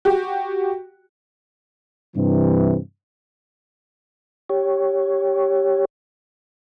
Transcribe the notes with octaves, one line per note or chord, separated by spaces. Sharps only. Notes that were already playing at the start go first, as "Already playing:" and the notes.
F#4 G4
G2 C3 E3
G4 C#5